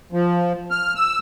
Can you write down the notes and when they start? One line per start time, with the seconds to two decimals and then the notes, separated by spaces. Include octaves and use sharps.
0.13 F3
0.71 F6
0.96 E6